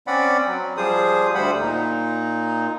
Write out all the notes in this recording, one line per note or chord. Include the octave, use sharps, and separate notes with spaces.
C4 C#4 D5 F#5 B5
F#3
F3 G3 G#4 C5 D#6
D2 G3 C5 F#5 B5
A#2 D#4